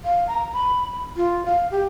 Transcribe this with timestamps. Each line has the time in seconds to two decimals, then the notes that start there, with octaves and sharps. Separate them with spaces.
0.05 F5
0.28 A#5
0.53 B5
1.16 F4
1.46 F5
1.71 G4